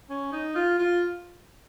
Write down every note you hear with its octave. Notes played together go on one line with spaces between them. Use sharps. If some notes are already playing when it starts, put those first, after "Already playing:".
C#4
D#4
F4
F4